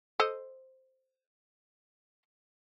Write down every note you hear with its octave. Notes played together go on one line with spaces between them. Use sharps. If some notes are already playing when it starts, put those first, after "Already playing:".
A4 C5 D#5